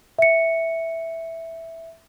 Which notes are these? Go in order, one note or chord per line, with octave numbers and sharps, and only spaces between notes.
E5 C#7